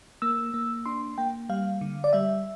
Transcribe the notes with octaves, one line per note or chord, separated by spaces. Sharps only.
A#3 E6
A#3
D4 C6
A#3 G5
G3 F5
D3
D5
G3 E5